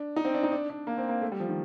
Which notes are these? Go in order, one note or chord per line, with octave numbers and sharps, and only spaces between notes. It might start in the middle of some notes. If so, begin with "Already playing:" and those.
Already playing: D4
D#4
C4
D4
D#4
D4
D4
A#3
C4
A#3
A3
G3
F3
D#3